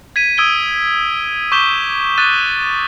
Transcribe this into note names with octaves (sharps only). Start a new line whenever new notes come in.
G#6 B6 D#7
D#6 E6 G#6 D7 G7
C#6 D6 G6 B6 E7 G7
D6 D#6 F#6 A6 D#7